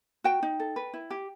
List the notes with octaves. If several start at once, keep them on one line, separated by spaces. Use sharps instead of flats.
F#4 G5
D#4
A4
B4
E4
G4